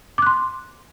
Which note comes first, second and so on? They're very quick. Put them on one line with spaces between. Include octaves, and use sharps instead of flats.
D6 F#6 C6